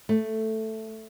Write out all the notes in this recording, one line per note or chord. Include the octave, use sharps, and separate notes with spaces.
A3